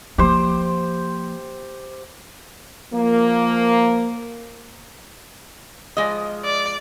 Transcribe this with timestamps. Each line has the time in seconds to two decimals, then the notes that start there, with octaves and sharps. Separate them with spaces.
0.18 F3 A#3 G4 C5
2.93 F3 A#3
5.97 F3 G#3 D#5
6.44 D5